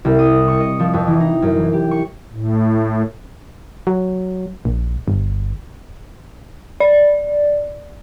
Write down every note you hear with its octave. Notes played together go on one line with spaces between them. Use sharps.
C2
D#6
C#6
D#5
F3
F2
E3
D#4
F#2
E3
G4
C#6
A2
F#3
A#1
G1
D5